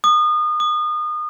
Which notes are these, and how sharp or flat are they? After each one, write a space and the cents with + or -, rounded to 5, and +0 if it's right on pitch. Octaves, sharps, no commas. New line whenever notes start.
D#6 -30
D#6 -30